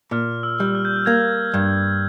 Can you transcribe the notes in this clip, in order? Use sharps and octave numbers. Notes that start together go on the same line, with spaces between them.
A#2 F6
E6
G3
F6
G6
F6
A#3 G#6
G2